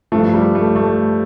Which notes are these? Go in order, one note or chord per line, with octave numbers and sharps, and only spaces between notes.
G2 F3 A3
G3
A3
A3